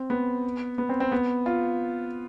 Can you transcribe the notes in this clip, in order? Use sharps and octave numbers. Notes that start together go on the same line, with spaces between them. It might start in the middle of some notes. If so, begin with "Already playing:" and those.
Already playing: C4
B3
B3
C4
C4
B3
F4